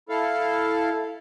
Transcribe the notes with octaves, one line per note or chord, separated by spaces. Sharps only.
E4 A4 F5